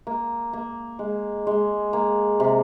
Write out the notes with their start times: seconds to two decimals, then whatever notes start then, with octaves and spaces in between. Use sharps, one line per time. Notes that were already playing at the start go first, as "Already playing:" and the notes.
0.07 A#3
0.53 A#3
0.99 G#3
1.47 G#3
1.93 A#3
2.40 C3